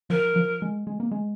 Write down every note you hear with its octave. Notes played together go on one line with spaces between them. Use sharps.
F3 A#4
F3
G#3
G#3
A#3
G#3